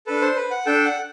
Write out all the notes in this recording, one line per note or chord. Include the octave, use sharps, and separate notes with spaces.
D4 A4 B4
C5
B4
F#5
D4 A4 G5
F#5